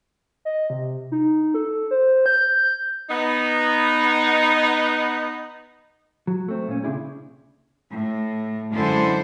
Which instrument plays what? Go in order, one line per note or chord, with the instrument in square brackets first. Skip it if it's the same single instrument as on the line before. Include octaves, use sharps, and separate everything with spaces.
[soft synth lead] D#5
C3
D#4
A4
C5
G6
[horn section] B3 D#4
[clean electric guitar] F#3
A3 C4
A#2 C#4
C#2 C#3 C4 D4 E4 G#4
[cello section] A2
F#2 D3 G#3 E4 A4 C5